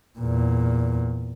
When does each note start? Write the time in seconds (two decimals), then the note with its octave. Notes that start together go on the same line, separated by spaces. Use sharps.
0.19 E2 A#2